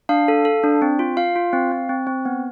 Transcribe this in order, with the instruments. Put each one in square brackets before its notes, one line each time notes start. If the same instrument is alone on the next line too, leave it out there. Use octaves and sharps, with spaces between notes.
[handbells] D4 F5
A4
A4
D4
C4
F4
F4 F5
F4
C4
C4
C4
C4
B3